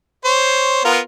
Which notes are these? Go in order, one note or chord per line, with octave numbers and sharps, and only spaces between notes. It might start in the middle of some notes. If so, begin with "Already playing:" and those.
C5 C#5
B3 F4 A#4